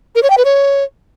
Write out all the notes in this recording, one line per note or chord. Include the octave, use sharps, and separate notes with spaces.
A#4
C#5
G5
B4
C#5